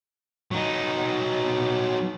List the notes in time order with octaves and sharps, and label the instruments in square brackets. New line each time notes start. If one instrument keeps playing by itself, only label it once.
[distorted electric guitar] F#3 D#4